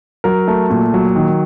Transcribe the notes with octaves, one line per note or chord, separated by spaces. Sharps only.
F#3 A#4
A3
A#2
F#3
D#3